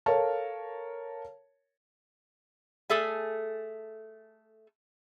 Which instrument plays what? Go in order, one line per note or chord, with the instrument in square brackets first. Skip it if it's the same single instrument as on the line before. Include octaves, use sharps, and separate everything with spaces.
[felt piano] A4 A#4 C#5 F5 A5
[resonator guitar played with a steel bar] A3 G#4 A4 E5 G#5